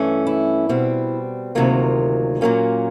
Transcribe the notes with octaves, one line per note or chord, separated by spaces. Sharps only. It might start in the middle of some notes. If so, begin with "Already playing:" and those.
Already playing: G2 E3 A3 C#4
E4
B2 G3 C4
D2 C3 D#3 F#3 A#3 F4
A#2 F#3 A#3 C#4